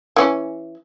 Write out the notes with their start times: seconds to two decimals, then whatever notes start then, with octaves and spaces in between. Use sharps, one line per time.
0.16 E3 C#4